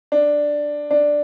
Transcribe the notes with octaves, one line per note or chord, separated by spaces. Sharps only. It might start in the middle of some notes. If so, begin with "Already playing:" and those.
D4
D4